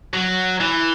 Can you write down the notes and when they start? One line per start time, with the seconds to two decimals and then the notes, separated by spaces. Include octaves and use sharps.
0.14 F#3
0.61 E3